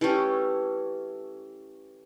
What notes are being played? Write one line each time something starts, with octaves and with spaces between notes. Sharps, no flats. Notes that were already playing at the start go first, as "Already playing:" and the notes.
E3 A3 C#4 G4